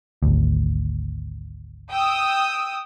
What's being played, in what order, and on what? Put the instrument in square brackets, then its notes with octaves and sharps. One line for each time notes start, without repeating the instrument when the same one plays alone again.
[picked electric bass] G#1 D2
[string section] G5 D#6 E6